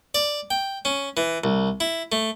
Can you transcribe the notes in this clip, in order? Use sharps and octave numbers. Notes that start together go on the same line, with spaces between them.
D5
G5
C#4
E3
C2
E4
A3